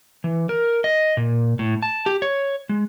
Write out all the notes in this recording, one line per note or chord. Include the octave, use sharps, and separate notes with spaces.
E3
A#4
D#5
A#2
A2
A5
G4
C#5
G#3